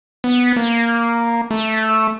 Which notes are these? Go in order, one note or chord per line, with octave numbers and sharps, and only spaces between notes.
B3
A#3
A3